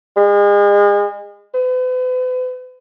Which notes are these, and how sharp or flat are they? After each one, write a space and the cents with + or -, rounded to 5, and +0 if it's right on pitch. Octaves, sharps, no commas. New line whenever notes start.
G#3 -35
B4 +45